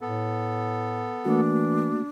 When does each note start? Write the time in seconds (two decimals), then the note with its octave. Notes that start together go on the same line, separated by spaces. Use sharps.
0.01 A2 B3 A4
1.25 E3 A3 A#3 D4 F#4